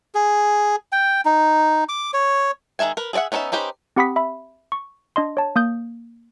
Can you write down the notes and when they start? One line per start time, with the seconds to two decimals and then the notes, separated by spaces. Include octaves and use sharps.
0.15 G#4
0.92 G5
1.25 D#4
1.89 D6
2.14 C#5
2.79 D#3 G#3 A4 E5 G#5
2.97 A#4 B4
3.13 G#4 A4 D5 E5 F#5
3.32 B3 C#4 D#4 C#5 E5
3.52 C#4 D#4 G4 B4 C5
3.96 C4 G4 F#5 B5 D#6 B6
4.16 E5 B5
4.72 C#6
5.16 D4 D#5 C6
5.37 C#5 A5
5.56 A#3 D#6 G6